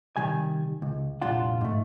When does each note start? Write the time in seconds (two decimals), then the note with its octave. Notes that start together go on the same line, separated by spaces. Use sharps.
0.17 C3 D#3 G3 G#5
0.82 C#2
1.21 C2 F2 A#2 D4 F4 F#5
1.61 G#2 A3